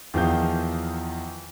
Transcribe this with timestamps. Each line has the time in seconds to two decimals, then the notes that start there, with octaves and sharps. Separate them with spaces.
0.14 E2 D#3 F3 F5 G6